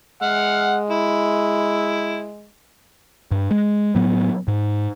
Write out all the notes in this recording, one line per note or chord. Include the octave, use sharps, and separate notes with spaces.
G#3 F#5 F6
E4
G2
G#3
A2 F#3 B3
G#2